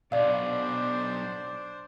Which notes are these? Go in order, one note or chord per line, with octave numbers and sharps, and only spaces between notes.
B1 B2 D4 C5 D5 F5